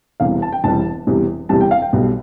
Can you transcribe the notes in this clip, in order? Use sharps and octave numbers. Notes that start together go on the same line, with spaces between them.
E1 E2 C3 G3 F5
A5
G5
E1 E2 C3 G3 A5
E1 E2 C3 G3
E1 E2 C3 G3 A5
G5
F5
G5
B1 B2 G3